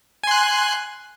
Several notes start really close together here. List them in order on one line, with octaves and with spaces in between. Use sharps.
G#5 C6 F#6